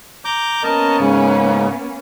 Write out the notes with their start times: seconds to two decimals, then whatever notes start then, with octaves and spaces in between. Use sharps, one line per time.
0.25 A#5 D6 G6
0.63 A#3 B3 C#4 A#4 D#5 A5
1.00 G#2 C#3